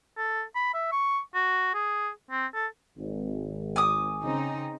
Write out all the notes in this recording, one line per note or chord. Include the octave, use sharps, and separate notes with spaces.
A4
B5
E5
C#6
F#4
G#4
C4
A4
G#1
G#5 D6 D#6
C#3 C4 D#4